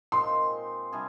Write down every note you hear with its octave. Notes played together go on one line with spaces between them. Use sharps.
A#2 G#3 C4 D#4 C6
C3 G3 D4 G#4